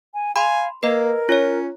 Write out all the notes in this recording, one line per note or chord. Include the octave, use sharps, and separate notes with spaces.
G#5
F5 G#5 B5 C6
A#3 A#4 B4 D#5
C#4 F4 C#5